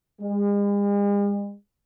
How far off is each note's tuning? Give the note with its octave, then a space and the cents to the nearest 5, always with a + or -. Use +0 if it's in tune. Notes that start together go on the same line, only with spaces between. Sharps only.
G#3 -45